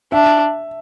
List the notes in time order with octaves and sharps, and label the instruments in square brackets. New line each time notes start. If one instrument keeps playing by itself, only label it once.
[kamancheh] D4 [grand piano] E5